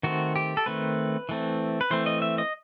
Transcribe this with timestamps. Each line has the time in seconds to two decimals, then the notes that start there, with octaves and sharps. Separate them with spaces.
0.03 D#3 A3 C4 F#4
0.36 G4
0.57 A4
0.66 D#3 A3 C4 B4
1.29 E3 A3 C4
1.81 B4
1.91 E3 A3 C4 C5
2.06 D#5
2.22 E5
2.38 D#5